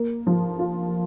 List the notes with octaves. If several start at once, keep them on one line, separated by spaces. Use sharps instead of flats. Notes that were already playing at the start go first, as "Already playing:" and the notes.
Already playing: A#3
F3
F4